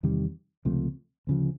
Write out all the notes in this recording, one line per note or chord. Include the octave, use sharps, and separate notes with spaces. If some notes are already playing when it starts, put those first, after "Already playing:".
E2 C3 D#3 G3
C#2 C3 F3 A3
D2 C#3 F3